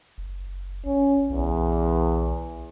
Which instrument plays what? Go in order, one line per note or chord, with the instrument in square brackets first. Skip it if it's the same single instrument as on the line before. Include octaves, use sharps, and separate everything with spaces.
[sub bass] F#1
[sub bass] G#1 [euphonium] C#4
[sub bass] B1 [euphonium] E2